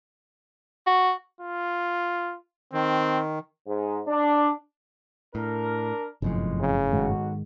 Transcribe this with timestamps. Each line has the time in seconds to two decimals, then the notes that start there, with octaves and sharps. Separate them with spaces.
0.87 F#4
1.41 F4
2.74 D#3 C4
3.67 G#2
4.08 D4
5.35 A2 D4 A#4
6.22 G1 F#2 A2 C3 F3 G#3
6.60 C#3
6.93 B1 G#2 D#3 G#3 F#4